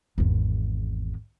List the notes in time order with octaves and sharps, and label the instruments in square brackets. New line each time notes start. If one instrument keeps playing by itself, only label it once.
[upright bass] G#1 E2